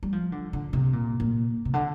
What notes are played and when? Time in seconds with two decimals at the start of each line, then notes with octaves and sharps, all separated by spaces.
0.03 G3
0.12 F3
0.32 D3
0.53 D3
0.73 C3
0.93 A#2
1.20 A#2
1.65 C3
1.74 D3